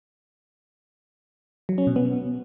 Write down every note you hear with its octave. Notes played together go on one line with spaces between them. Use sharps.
F#3
C#4
B2
B3